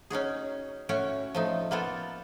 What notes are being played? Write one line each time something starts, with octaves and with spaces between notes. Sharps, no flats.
C#4 D#4 F#4 G#4
A2 C#4 F#4 C#5
F3 A3 D#4
A#3 B3 F4 A4